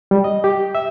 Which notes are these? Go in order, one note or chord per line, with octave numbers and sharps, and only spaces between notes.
G3
D#5
G4
E5